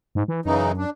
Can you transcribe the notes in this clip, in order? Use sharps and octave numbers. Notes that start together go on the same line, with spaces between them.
G#2
E3
F#2 C#3 E3 D#4
D4